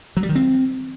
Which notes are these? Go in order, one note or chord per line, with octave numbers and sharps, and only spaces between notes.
F#3
G3
D#3
C4